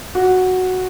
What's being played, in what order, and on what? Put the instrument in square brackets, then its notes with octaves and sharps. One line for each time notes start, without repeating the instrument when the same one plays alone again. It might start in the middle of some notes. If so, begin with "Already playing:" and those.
[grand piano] F#4